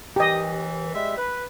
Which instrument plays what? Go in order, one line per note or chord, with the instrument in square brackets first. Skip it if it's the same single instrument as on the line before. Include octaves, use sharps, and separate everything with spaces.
[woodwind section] D#2 E3 [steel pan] G4 D#5
[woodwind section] G3 G#3 E5
B4